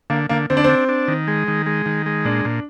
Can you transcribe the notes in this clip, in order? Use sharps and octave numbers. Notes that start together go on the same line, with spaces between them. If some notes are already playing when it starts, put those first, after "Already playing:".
D3 A#3
D3 A#3
D3 C4
D4
C4
D4
D4
D#3
G#3
D#3
G#3
D#3
G#3
A#2 D4
A#2